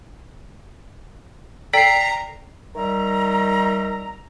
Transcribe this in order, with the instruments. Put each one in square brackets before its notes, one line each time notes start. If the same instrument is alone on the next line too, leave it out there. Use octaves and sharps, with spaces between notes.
[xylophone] A4 D5 G5 [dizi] A#5 [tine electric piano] B6 C7
[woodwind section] D#3 G3 E5 A#5